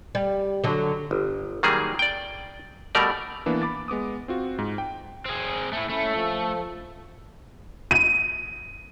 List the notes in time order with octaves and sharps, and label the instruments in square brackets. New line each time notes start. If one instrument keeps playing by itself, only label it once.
[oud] G3
D3 F#3
[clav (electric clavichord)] G1
D#3 F#3 G3 A#3 G#4
D5 G5
B2 G3 A3 A#4 D5
[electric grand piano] E3 A#3 B3 D4
B5 D6 A6
G#3 B3 D6 D#6
C4 F4 F#4
G#2
G5
[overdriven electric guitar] C4 G#4
A3 E4
[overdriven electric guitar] A3 [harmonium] C#4 E4
[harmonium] F3 A4
[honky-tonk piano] D#7